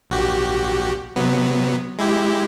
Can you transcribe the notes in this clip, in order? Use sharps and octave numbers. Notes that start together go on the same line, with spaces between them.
A#1 F#4 G4
C3 F#3 B3
G#3 E4 G4